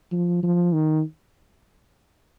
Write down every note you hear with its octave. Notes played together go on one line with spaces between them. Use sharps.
F3
F3
D#3